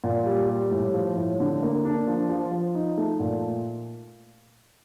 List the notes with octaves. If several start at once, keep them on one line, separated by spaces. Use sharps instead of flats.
A#2
G3
G3
A2
F3
A2
D3
A#3
D4
F3
F3
F3
D#4
A3
A#2